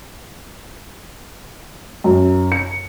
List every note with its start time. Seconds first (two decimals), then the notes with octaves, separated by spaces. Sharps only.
2.04 F#2
2.52 C#7